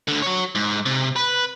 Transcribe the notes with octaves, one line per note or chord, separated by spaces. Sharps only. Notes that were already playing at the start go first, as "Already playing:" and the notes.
D2 D3
F#4 C#5
G#2
C3
B4